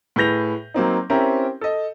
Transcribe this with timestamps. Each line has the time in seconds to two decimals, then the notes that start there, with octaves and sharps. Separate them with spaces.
0.16 A2 G#4 B4 G6 A#6 F7
0.74 F#3 A#3 C4 D#4
1.10 C4 C#4 E4 G4 A#4 C5
1.61 A4 D#5